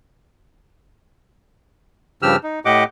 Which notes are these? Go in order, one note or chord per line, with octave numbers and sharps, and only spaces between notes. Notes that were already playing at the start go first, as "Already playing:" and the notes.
G2 C#3 F3 G4 E6 F6
D#4
A2 G4 D#5 F#5 D6